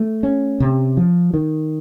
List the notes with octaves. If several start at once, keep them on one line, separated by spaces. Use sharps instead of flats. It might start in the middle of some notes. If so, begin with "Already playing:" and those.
Already playing: A3
C#4
C3
F3
D#3